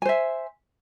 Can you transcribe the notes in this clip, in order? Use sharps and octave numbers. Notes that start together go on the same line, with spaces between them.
C5 E5 G#5